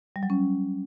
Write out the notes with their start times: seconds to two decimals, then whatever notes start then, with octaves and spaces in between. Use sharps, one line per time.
0.16 G3
0.23 F#3
0.30 C#4